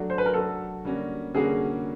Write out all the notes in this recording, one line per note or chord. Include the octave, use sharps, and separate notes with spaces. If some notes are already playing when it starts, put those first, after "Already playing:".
Already playing: F#3 A3 D4 F#4
C5
B4
A#4
F#3 A3 D4 F#4 A4
D3 G3 A#3 C#4 F#4
D3 G3 A#3 C#4 F#4 G#4